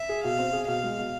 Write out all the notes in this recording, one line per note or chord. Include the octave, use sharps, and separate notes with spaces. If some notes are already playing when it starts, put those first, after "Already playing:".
Already playing: E5
G#4
B2 F5
C4
G#4
B2 F5
G#3
B2